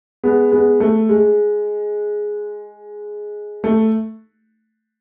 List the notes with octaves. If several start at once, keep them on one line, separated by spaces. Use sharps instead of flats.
G#3 B3
G#3 B3
A3
G#3
A3